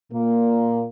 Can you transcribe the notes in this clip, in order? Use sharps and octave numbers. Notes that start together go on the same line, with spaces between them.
A#2 A#3